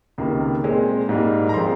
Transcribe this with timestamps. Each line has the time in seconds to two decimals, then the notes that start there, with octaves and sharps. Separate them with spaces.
0.18 C#2 C3 D#3 A#3
0.64 A#2 G#3 C4
1.09 G#2 G3 A#3
1.49 A#5
1.54 F3 G#3 C4 C6